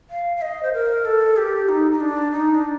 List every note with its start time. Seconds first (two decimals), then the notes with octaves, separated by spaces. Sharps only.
0.10 F5
0.37 F5
0.42 D#5
0.63 C5
0.73 A#4
1.05 A4
1.37 G4
1.69 D#4
1.91 D#4
2.00 D4
2.31 D#4
2.55 D4